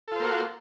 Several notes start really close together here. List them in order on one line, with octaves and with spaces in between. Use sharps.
A4 F4 C5 A#3 F#4